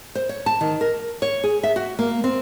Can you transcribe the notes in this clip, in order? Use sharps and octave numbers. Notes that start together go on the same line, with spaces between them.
C5
C#5
A5
D#3
A#4
C#5
G#4
E5
F#4
A#3
C4